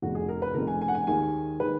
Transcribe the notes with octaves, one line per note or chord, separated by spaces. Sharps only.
F1 F2 C#3 F#4
G#4
A#4
B4
F1 F2 C#3 A#4
G#5
G#5
F#5
G#5
D#2 D#3 G#3 G#5
D#3 G#3 B4